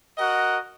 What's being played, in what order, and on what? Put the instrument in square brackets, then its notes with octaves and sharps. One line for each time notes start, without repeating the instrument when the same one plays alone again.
[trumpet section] F#4 A#4 D#5 F#5